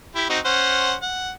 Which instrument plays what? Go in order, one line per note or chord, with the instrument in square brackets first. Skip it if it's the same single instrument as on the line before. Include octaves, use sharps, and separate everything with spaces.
[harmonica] E4 G4
C4 D#4 F#4
C#4 C5 F#5
F#5